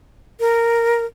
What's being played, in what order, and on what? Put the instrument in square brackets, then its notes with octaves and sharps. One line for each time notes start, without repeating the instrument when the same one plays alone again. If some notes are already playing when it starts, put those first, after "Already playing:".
[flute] A#4